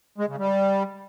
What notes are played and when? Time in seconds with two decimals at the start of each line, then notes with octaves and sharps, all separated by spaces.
0.18 G#3
0.28 C#3
0.38 G3